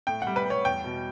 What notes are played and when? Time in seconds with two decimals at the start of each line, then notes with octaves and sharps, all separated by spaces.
0.07 A2 G5
0.22 G3 F#5
0.36 B4
0.45 G3
0.50 C#5
0.65 E2 G5
0.84 B2